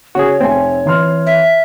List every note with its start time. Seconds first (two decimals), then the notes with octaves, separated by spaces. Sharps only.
0.15 C#3 F#4 G#4 C#5
0.41 F1 A3 C4 G#5
0.85 E3 C6 F6
1.26 E5